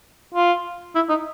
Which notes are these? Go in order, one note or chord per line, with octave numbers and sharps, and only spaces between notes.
F4
E4
D#4